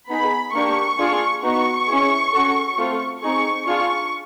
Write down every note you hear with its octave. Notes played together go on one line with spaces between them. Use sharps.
B3 D#4 G#4 B5
A#3 D4 G4 C#6
D4 F4 G#4
B3 D#4 F#4 C#6
C#4 E4 G#4
C#4 F#4 A4
A3 C4 F4 A4
C4 D#4 G#4 C#6
D4 F4 G#4 C#6